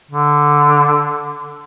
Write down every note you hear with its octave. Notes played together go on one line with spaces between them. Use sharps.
D3